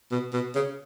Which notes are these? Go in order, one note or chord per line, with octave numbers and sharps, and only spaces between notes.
B2
B2
C#3